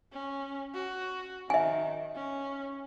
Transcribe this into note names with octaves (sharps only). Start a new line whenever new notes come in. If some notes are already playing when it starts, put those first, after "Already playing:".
C#4
F#4
D#3 E5 G#5
C#4